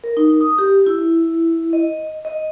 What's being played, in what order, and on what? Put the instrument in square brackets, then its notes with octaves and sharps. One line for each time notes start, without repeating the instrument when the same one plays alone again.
[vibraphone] A#4
D#4
D#6
G4
E4
D#5
D#5